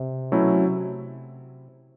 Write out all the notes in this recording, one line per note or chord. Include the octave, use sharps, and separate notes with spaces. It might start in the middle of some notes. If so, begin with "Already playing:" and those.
Already playing: C3
B2 F#3 A3 C#4 E4
C3